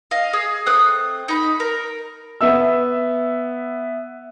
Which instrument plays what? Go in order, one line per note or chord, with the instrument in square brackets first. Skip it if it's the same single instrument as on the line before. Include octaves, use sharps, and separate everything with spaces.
[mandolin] D#5 F5
G#4
A3 C4 D#6 F#6
D#4 B5
A#4
[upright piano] B3 E5 E6